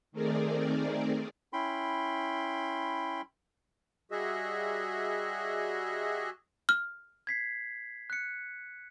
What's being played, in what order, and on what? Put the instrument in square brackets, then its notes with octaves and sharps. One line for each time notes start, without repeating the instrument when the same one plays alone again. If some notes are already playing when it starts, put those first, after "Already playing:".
[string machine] D#3 A3 C4 G#4 A#4 D5
[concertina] C#4 E4 G5 B5 C6
[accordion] G3 F#4 G#4 D#5 E5
[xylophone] F6
[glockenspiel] G#6 B6 C7
F#6 C#7